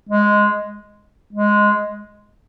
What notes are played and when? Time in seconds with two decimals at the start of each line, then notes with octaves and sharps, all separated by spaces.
0.09 G#3
1.33 G#3